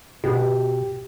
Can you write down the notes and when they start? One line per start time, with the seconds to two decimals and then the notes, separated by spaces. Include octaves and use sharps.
0.24 B2 G4